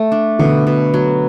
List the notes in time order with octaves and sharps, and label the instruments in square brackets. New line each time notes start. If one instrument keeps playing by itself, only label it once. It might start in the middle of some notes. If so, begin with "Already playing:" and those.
Already playing: [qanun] A3
D4
[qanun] B2 [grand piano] D3
[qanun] B2
F#3